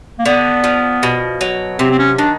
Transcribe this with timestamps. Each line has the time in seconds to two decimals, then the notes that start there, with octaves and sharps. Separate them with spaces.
0.19 A#3
0.26 D3 B3
0.64 F3
1.03 B2
1.41 F#3
1.79 C3 C4
1.91 C4
1.99 C#4
2.18 D#3 D4